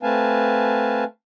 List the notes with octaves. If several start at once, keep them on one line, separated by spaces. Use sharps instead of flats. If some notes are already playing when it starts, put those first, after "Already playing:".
A3 C4 B4 F5 G#5 A5